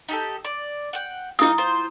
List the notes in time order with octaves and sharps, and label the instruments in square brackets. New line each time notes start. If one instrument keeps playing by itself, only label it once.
[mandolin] D#4 G4 A4
D5
F#5 G5
[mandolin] A#3 D#4 [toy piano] E4 D#6
[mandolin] F4 C5